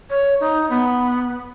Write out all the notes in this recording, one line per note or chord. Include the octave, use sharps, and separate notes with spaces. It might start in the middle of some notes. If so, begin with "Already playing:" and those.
C#5
D#4
B3